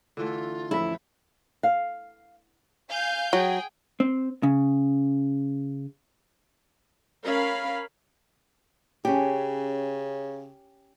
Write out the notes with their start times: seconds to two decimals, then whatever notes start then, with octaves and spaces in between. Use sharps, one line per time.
0.17 D3 E3 A3 F4
0.71 A1 F2 E4 A4 B6
1.63 F5
2.89 F5 G#5 G6
3.33 F#3 G#4 G5
4.00 C4
4.43 C#3
7.26 C#4 A#4 F5 B5
9.05 C#3 C#4 G4